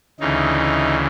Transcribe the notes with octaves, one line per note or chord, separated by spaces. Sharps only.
D2 C#3 E3 D#4